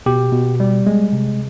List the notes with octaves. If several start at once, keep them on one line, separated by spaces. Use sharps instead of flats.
B2 G4
B2
G3
G#3
C3